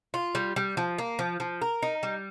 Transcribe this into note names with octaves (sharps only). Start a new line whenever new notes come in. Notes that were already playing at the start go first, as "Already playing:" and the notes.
F4
G3
G3
F3
A#3
F3
F3
A#4
D#4
G3